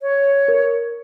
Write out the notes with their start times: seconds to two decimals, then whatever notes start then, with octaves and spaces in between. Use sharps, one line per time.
0.02 C#5
0.48 A#4